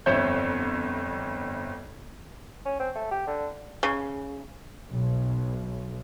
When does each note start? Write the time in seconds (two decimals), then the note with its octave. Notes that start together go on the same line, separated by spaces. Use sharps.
0.06 G1 F2 C5 C#5 E5 G6
2.65 C#4
2.80 C4
2.95 A3
3.11 G4
3.27 D3
3.83 C#3
4.91 B1